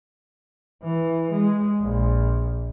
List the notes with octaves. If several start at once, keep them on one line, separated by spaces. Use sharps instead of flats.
E3
G#3
A#1